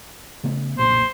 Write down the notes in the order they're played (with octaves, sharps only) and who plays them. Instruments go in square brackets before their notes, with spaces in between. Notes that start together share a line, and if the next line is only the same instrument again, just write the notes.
[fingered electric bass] C#3 A3 B3
[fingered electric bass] F#1 B1 A#2 [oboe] C5